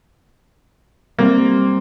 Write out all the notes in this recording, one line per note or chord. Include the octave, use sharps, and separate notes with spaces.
G3 A#3 C4